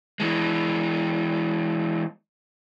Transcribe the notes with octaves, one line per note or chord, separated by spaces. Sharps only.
E3 G#3